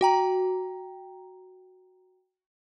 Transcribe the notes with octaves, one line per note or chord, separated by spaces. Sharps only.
F#4 G5 A#5